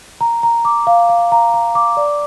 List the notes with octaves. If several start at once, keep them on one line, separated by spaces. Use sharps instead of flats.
A#5
A#5
D6
F5
F5
A#5
A#5
D6
D5